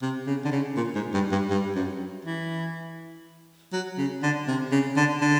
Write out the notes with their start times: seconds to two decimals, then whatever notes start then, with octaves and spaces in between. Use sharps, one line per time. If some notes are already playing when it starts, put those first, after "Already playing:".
0.02 C3
0.27 C#3
0.45 D3
0.52 C#3
0.77 A#2
0.95 G#2
1.14 G2
1.32 G2
1.50 G2
1.76 F#2
2.25 E3
3.73 F#3
3.98 C#3
4.23 D3
4.48 C3
4.72 C#3
4.97 D3
5.21 D3